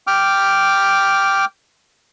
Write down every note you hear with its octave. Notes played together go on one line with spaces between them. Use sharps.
G5 D6 F6